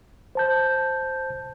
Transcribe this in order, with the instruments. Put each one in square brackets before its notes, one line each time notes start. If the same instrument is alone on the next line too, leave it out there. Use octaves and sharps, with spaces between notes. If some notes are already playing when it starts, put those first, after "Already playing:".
[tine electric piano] C5 A5 G6